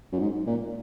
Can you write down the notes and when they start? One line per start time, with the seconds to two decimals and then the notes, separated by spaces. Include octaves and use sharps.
0.12 F#2
0.20 G#2
0.47 A#2